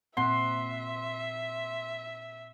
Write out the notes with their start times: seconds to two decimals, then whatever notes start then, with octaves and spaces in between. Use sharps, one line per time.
0.17 A#2 C4 E5 F#5 C6